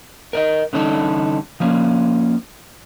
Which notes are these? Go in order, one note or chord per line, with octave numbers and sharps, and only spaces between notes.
A#4 D5 D#5
D3 E3 G3 C#4 D#4 A4
F3 A#3 C#4